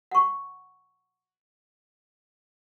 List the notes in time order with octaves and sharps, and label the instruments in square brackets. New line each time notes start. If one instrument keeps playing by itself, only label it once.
[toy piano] F#5 C#6